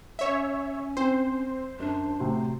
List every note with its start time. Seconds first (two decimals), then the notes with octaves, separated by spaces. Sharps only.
0.19 C#4 C#5 E5
0.97 C4 C5
1.79 F#2 D4
2.19 A2 C3 F#3